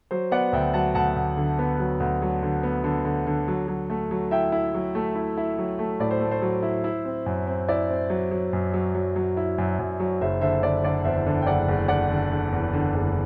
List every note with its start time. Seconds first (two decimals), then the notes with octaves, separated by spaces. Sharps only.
0.11 F#3 C5
0.31 B3 D5 F#5
0.52 D2 E5 G5
0.74 F#3 F#5 A5
0.95 D2 F#5 A5
1.16 D2
1.37 D3
1.59 B3
1.80 F#3
2.00 D2
2.22 F#3
2.43 D3
2.63 B3
2.84 D3
3.05 D3
3.27 D3
3.48 F#3
3.68 F#3
3.90 A3
4.11 F#3
4.31 E4 E5 G5
4.52 E4
4.74 F#3
4.95 A3
5.15 E4
5.37 E4
5.58 F#3
5.79 A3
6.00 A2 D5
6.11 C5
6.21 A3
6.31 C5
6.42 F#3
6.63 E4
6.84 E4
7.05 C4
7.26 F#2
7.47 C4
7.68 E4 D5
7.90 C4
8.10 F#3
8.31 F#3
8.53 F#2
8.74 F#3
8.94 F#3
9.16 F#3
9.37 E4
9.58 F#2
9.79 F#2
10.00 F#3
10.21 F#1 C5 E5
10.41 D3 C5 E5
10.63 D3 D5
10.83 D3 D5
11.04 E2 C5 E5
11.26 D3
11.42 G5
11.47 F#1 D5 F#5
11.68 F#1
11.88 D3 D5 F#5
12.10 D3
12.31 D3
12.52 E2
12.73 D3
12.94 F#1